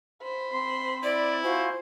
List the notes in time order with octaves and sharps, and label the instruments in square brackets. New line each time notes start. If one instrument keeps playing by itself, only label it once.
[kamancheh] C5 B5
[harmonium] C4 [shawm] C6
[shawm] E4 [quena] D5
[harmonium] F4 F#4 G#5 [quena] C5